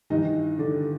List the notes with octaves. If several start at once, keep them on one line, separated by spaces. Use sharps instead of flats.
G2 D#3 E3 D#4
D3 D4